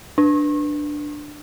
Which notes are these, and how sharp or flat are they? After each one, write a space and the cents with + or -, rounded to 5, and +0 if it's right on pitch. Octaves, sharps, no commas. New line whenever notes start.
D4 +10